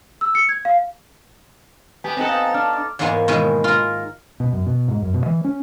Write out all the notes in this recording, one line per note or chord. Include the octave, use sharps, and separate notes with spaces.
E6
C#7
G#6
F5
A3 B3 G4 G#5
B3 C4 D#4 A4 F#5
F5
D4 F6
D6
E2 G#2 G#3 A#3 B3 G#5
B2 D#3 E3 G#3
F4 A#4
B2
F#2
B2
G#2
F#2
B2
E3
C#4